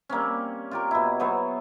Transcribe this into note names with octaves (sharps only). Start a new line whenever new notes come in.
G3 A#3 C4 C#4
F4 G4 A#4
B2 E4
F#3 B3 C5 C#5